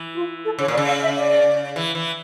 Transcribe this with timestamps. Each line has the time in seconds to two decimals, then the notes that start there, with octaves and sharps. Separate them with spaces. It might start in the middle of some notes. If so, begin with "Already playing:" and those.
Already playing: E3
0.15 F4
0.45 A4
0.59 C#3 C#5
0.68 A#2
0.74 D5
0.77 C#3
0.88 F5
1.02 E5
1.17 D5
1.76 E3
1.95 E3